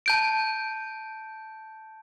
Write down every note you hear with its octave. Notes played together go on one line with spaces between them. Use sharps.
A5 G6 D7